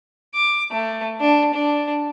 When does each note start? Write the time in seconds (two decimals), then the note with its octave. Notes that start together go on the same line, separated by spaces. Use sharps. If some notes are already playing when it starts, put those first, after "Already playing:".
0.34 D6
0.71 A3
1.20 D4
1.54 D4